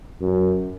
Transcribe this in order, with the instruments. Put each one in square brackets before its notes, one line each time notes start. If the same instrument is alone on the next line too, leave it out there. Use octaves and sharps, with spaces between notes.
[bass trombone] F#2